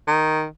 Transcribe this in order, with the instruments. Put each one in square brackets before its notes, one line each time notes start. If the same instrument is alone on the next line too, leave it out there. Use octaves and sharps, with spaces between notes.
[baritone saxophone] D#3